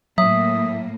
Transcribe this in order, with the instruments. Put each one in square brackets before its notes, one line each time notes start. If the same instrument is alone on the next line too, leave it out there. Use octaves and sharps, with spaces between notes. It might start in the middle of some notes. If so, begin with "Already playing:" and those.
[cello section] A2 A#3 [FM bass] F#3 [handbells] E5 [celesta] D#6